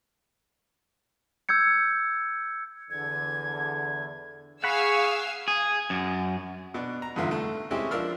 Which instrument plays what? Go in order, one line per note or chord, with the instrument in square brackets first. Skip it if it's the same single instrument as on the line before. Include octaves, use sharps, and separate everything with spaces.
[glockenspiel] E6 G6 G#6 C#7
[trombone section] E2 D3 [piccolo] G#6
[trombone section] G#4 [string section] F5 G#5 E6 [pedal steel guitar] F#5 B5 [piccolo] C#6
[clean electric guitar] G#4
F#2
[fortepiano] B2 D4
A#5
G#1 E2 G2 D3 F4 E5
A3
G#3 C4 C#4 E4 G4
F3 D4 A#4 F5 E6 F6